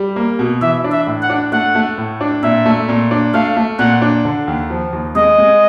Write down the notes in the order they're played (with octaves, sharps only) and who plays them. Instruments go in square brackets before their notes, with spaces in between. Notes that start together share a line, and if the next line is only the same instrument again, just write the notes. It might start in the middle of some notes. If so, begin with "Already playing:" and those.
Already playing: [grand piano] G3
A#3
B2
[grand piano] E3 [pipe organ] E5
[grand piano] D4
[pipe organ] E5
[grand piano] A2
[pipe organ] F#5
[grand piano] D4
[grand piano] A3 [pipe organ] F#5
[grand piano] A3
A2
D4
[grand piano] A#2 [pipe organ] E5
[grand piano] A3
A#2
D4
[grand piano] A3 [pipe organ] F5
[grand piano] A3
[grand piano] A#2 [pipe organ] F#5
[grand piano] D4
D3
D#2
F3
D#2
[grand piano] G#3 [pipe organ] D#5
[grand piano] G#3